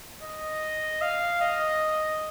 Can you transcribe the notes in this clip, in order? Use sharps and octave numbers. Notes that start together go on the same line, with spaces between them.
D#5
F5
D#5